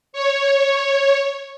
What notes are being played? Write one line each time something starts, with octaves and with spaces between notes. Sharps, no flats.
C#5